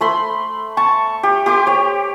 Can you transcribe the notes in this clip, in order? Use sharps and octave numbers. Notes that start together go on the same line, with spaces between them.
A3 B5 C6
A5 C#6
G4
G4 C6 D6
G4 C#5